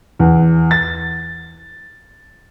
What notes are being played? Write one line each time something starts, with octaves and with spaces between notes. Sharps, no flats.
E2
A6